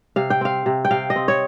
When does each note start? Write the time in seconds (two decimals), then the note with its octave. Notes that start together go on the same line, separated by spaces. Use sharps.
0.16 C3 F5
0.30 G5
0.41 C4 F5
0.66 C3
0.85 G5
0.91 C3 F5
1.10 D#5
1.16 C4
1.28 C#5